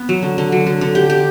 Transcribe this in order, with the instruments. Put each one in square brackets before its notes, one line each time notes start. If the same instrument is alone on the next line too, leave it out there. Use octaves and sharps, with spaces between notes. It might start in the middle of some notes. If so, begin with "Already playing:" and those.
Already playing: [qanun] B3
F#3
D3
D3
F#3
D3
D3
G4
G4